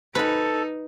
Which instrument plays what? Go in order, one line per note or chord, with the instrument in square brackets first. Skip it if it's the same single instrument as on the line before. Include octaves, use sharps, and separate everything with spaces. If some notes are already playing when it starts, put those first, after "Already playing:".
[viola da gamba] D#4 [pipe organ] A4 [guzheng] B4 B5